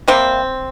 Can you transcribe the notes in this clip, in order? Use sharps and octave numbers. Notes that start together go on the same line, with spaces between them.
C3 G3 A#3 C4